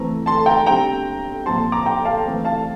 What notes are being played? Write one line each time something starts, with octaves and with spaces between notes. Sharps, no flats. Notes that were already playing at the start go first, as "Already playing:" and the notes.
Already playing: E3 A3 C4 A#5
A5 C6
G5 A#5
D3 G3 C4 G5 A#5
A#2 F3 C4 A5 C6
A#5 D6
G5 A#5
F5 A5
E3 A3 C4
F5 A5